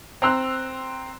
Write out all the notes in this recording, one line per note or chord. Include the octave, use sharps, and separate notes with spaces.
C4 A#5 C6 E6 F#6